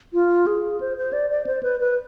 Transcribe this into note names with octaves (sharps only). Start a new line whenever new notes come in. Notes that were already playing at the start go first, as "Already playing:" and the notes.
F4
G#4
C5
C5
D5
D5
C5
B4
B4